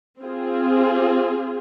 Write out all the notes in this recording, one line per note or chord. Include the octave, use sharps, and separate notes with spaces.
C4 F4 G#4